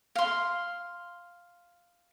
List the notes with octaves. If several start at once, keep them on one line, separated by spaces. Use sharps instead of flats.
F5 C6